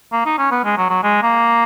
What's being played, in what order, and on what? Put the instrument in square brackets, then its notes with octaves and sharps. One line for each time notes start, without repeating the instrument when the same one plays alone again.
[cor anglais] A#3
D#4
C#4
B3
G#3
F#3
F#3
G#3
A#3